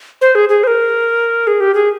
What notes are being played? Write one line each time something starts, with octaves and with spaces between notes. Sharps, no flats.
C5
G#4
G#4
C5
A#4
G#4
G4
G#4